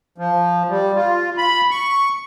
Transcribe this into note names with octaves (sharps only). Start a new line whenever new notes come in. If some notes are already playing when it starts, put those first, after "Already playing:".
F3
G3
F4
B5
C#6